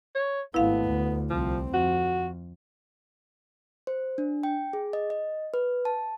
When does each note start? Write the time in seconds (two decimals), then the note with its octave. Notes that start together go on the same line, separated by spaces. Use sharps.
0.15 C#5
0.54 G#1 A3 B3 E4 F5
0.85 D2
1.30 C2 F3 C4
1.74 F2 F#4
3.87 C5
4.18 D4
4.43 G5
4.73 G#4
4.93 D#5
5.10 D#5
5.54 B4
5.85 A5